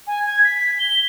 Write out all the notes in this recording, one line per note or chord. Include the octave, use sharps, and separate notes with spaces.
G#5
G#6
B6
G7